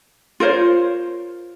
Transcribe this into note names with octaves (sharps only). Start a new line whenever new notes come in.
F4 A#4 C5 C#5